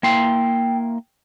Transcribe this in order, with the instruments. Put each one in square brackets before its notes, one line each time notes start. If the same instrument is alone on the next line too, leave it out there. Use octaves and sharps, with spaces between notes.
[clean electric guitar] A#3 E4 C6 [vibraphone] G5